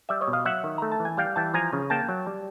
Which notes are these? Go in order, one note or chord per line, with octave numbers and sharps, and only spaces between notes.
G3 D5 E5
C#5 D#5
B2
D#5 F5
F#3 E5 F#5
D#3
A3 A#5
A5
E3
G#5
G3 F5 G5
E3 G5 A5
F3 G#5 A#5
C#3
A#3 G5 A5
F#3
G3